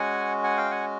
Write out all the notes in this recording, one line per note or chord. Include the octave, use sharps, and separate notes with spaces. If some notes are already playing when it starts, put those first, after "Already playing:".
Already playing: G#3 C#4 F#4 F#5 G#5
F#5 G#5
F5 G5
F#5 G#5